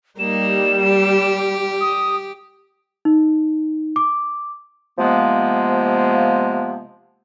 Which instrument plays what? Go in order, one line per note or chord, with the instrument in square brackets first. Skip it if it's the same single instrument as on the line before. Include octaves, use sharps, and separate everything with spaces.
[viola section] G3 [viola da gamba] A#3 D#4 [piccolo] E7
[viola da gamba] G4
[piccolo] D#6
[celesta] D#4
D6
[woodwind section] C3 F3 G#3 A#3 B3